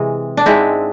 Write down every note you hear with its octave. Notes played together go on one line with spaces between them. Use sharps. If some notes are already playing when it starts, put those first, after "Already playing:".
Already playing: C3 E3 G#3
D4
G#2 G#3 C4 E4